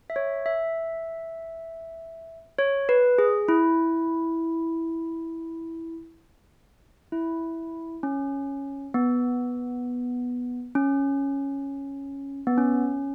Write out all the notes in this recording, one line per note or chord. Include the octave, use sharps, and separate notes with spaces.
E5
C#5
E5
C#5
B4
G#4
E4
E4
C#4
B3
C#4
B3
C#4